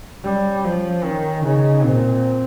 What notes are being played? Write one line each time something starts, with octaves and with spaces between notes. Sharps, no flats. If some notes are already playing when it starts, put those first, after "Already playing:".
G3 C#4
F3
D#3 C#4
C#3 D#4
A#2 C4